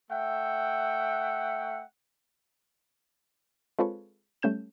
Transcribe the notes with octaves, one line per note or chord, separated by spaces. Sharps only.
A3 E5 F#5 G5
G#3 C4 F4 A4 B4 C#5
G3 A3 C#4 G6 E7